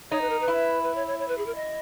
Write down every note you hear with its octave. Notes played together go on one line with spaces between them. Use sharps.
D#4 C#5
B4
A#4
B4
E4
B4
C#5
C#5
C#5
B4
G#4
A#4
D#5